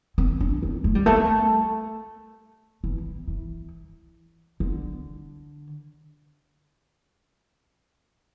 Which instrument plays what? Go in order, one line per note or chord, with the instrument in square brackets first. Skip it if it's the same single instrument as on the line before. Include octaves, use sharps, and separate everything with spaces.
[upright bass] C4
D4
C4
A3
G3
A3
E3
E3
D3